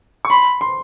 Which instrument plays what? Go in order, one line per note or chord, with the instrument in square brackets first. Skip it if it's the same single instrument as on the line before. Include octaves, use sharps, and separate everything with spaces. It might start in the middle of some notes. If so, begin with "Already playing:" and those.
[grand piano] C#6
[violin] B5 [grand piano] C6
[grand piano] C6